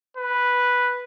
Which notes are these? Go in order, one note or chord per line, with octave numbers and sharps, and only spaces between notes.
B4